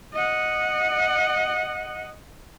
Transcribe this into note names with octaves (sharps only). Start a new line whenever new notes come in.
D#5 F#5